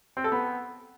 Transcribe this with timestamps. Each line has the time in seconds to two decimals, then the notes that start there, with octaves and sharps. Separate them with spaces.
0.17 C4
0.24 A4
0.32 B3